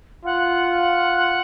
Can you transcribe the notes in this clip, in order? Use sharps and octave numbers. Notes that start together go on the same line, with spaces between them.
F4 F#5